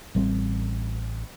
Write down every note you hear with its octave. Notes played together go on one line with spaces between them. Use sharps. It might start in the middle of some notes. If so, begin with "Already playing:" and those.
A1 G3 C4